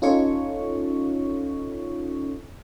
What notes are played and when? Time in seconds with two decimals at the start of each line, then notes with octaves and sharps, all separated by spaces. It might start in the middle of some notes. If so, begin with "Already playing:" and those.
0.02 C#4 D#4 F4 A4 C#5 C#6